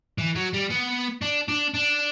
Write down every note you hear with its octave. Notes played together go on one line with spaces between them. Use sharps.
E3
F#3
G3
B3
D4
D4
D4